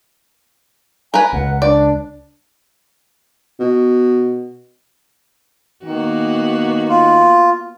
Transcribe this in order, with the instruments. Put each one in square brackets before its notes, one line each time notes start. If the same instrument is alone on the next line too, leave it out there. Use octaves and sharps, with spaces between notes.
[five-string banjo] A#4 B4 [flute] G#5
[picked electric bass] C#2 [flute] F#5
[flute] D4 [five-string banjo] D5
[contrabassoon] B2
[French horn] D#3 [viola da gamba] A#3 B3 F#4
[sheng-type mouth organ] F4